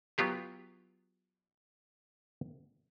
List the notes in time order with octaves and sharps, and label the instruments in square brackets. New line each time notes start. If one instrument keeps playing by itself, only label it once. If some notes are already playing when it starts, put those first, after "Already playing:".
[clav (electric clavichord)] F#3 B3 F4 G4 G#4